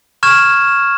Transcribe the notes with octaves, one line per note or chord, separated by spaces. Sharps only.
C#6 F6 G#6 E7